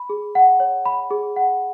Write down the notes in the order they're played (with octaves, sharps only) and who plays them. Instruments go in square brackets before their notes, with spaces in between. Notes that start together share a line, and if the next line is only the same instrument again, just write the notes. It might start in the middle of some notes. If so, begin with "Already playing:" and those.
Already playing: [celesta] B5
G#4
F#5
C#5
B5
G#4
F#5